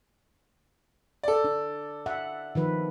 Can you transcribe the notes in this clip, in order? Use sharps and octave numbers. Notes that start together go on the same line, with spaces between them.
A4 D5
D4
E5 F#5
D#3 F3 B4